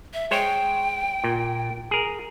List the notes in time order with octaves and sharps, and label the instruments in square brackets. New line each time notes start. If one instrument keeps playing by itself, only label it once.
[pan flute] E5
[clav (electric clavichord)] G#3 C5 C#5 [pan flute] G5
[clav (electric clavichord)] A#2
G#4 A#4